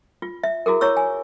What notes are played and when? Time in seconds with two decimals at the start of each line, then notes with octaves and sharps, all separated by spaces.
0.22 F4
0.43 E5
0.66 E4 F#4 G#4 A#4
0.81 E4 C#5 C#6 E6
0.97 G#5